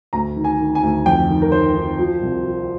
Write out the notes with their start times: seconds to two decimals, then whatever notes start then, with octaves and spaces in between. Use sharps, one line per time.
0.13 D2 A#5
0.36 D#3
0.44 G#5
0.60 D#3
0.75 G#5
0.83 D2
1.06 F2 G5
1.29 D#3
1.42 A#4
1.52 D#3 C5
1.76 D#3
1.99 F3
2.22 C2
2.45 F3